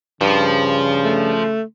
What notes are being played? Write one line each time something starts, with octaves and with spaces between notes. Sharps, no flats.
G2 C#3 F3
A3